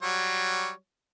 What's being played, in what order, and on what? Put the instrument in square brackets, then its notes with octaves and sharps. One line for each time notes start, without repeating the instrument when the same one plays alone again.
[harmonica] F#3 G3 C#5